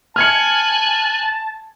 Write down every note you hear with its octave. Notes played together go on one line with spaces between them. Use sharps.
G#5 A5 F6 F#6 G#6 C#7